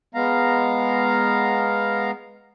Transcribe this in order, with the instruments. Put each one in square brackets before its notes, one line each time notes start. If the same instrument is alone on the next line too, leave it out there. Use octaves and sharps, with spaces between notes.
[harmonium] G#3 B3 F5 A#5